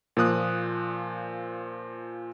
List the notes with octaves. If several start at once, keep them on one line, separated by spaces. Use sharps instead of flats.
A#2 F3 D#6 F#6